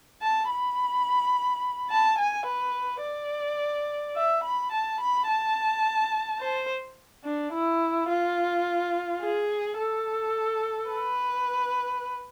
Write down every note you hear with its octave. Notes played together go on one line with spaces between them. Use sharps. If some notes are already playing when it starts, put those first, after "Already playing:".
A5
B5
A5
G#5
B4
D5
E5
B5
A5
B5
A5
C5
D4
E4
F4
G#4
A4
B4